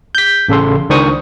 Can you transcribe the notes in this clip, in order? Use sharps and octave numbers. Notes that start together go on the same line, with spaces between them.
G6 B6
A1 C#3 A4 C6
C#2 D#3 D4 C5 C#6 D#6